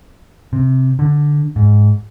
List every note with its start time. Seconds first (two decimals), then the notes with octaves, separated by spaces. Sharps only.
0.53 C3
0.99 D3
1.56 G#2